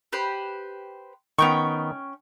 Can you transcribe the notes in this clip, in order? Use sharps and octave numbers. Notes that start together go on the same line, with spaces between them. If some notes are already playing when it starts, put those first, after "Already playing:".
G4 B4 C5
D#3 B3 C#4 G5 C#6